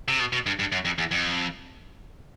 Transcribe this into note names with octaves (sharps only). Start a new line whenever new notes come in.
C3
B2
B2
G2
G2
F#2
F2
E2
F2